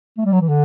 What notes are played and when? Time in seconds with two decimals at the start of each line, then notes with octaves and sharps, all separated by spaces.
0.17 A3
0.25 G3
0.33 F#3
0.41 E3
0.49 D3